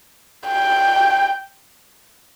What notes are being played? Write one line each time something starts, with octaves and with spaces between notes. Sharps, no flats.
G5